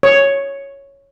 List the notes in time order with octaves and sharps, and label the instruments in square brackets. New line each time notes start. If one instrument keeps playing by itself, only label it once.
[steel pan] C#5